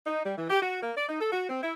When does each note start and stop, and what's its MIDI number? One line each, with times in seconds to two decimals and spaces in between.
0.06 0.24 63
0.25 0.36 55
0.37 0.48 52
0.49 0.58 67
0.62 0.81 66
0.82 0.91 58
0.96 1.06 74
1.08 1.19 63
1.20 1.31 69
1.32 1.44 66
1.47 1.62 60
1.62 1.74 64